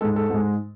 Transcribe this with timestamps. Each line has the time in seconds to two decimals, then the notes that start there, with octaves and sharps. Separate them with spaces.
0.01 G#2 G#3 A4
0.16 A4
0.30 G#2 G#3